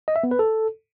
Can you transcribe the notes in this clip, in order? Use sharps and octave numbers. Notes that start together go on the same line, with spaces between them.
D#5
E5
B3
B4
A4